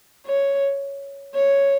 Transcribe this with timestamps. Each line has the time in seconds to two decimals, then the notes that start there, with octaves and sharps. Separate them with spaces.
0.27 C#5
1.35 C#5